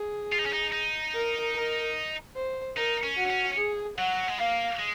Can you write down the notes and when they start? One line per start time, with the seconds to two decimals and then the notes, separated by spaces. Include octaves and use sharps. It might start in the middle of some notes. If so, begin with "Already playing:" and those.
Already playing: G#4
0.32 F4
0.39 D#4
0.46 C#4
0.53 D#4
0.73 D#4
1.14 A#4
1.55 A#4
2.35 C5
2.76 D#4 A#4
3.03 C#4
3.17 F#4
3.30 C#4
3.57 G#4
3.98 F#3 F#5
4.28 G#3
4.38 A#3 F5
4.79 G#3